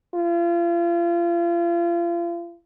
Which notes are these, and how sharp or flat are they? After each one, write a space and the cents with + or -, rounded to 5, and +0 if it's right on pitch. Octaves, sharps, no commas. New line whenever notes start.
F4 -35